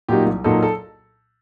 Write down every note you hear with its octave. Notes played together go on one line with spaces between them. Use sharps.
A#2 F#3 A#3 D#4 G4
C2
A#2 F#3 A#3 D#4 A4
A4